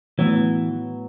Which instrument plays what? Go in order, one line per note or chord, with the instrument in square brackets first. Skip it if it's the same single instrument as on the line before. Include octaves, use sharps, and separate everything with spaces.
[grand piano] A2 F#3 B3 [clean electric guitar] E3